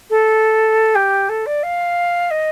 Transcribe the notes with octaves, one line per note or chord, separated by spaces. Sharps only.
A4
G4
A4
D5
F5
D#5